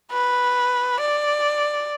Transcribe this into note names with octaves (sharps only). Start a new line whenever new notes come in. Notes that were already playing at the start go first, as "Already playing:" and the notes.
B4
D5